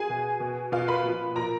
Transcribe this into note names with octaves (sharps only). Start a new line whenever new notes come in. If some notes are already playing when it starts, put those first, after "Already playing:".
Already playing: G#4 G#5
B2
B2
B2 F4 F5
B4 B5
A#2 F3
A#2 F3 A#4 A#5